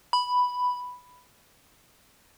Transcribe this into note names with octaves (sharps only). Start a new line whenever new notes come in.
B5